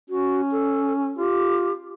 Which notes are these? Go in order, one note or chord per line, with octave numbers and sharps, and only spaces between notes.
C#4 F#4
A4
F4 G4